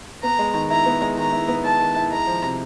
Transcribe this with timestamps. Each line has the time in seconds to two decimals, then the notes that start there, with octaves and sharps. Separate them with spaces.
0.23 B3 A#5
0.39 G#3
0.54 D#3
0.70 E4 A#5
0.86 B3
1.02 G#3
1.17 D#3 A#5
1.32 E4
1.48 B3
1.64 G#3 A5
1.80 D#3
1.96 E4
2.11 G#3 A#5
2.27 F3
2.43 C3